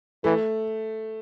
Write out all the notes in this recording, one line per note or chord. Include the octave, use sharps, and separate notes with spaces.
E3 A3